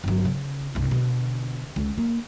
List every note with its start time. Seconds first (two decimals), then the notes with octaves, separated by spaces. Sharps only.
0.04 G1 F#3
0.25 C#3
0.75 G1 C2
0.91 B2 D3
1.76 C#2
1.98 A#3